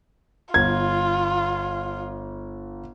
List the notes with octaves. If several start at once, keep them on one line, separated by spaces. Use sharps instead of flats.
G1 F4 G#6